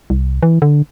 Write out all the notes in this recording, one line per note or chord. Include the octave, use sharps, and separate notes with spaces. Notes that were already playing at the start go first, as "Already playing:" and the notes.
C2
E3
D3